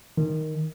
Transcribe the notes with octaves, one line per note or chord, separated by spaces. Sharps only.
D#3